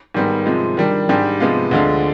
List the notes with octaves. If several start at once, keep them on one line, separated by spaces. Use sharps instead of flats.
G#2 D#3 G3 B3
C3 F3 G#3
D#3 G3 D4
G#2 G3 D4 G4
C3 F3 G#3 B3 F4
D2 D3 G#3 D4 F4